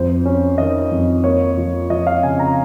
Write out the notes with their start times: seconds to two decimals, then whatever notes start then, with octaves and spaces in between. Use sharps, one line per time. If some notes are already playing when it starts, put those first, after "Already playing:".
Already playing: F2 C5
0.25 C#4
0.58 D#3 D#5
0.91 F2
1.24 A#3 C#5
1.57 F3
1.90 F3 D#5
2.07 F5
2.23 C#3 G#5
2.39 A#5